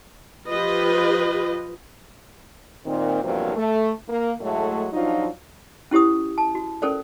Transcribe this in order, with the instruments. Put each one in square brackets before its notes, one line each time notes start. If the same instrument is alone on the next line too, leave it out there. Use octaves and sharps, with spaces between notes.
[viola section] F3 F4 G4 B4 D#5
[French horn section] A#2 D#3 C4
E2 G2 C3 F3 F#3 A#3
A3
A#3
A2 F#3 G#3 A3
F3 F#3 D4 D#4 F4
[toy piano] C#4 E4 G4 C5 D#6
A5
F#4
C#4 A4 A#4 C5 D5